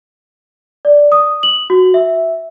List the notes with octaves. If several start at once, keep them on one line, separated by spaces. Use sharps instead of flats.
D5
D#6
F#7
F#4
E5